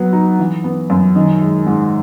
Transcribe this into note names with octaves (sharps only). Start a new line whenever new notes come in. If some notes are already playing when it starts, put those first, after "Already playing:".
Already playing: F#3 B3 F#5
D#4
E3
B3
F#2
D#3 D#5
G#3
G#2